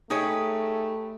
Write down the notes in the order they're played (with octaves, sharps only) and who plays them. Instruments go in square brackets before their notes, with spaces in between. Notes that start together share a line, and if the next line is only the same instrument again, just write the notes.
[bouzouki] G#3 G4 B4 [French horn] A3 [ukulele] D#4 G#4 C#5